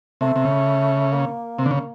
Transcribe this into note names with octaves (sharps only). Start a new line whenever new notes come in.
C3 A3
C3
C#3
A#3
C3
D3
C#3